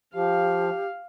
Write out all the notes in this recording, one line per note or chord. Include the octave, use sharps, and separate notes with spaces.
F3 G4 F5